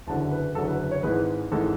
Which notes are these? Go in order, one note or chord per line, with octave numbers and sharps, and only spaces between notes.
F#1 E2 D3 F#3 A5
B4
F#1 E2 D3 F#3 A4
B4
B4
C#5
G#1 G#2 E3 G#3 B4
G#1 G#2 E3 G#3 A4